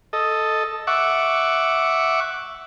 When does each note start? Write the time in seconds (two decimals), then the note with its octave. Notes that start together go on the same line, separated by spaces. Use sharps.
0.13 A4 D#5
0.87 E5 F#5 C#6 D6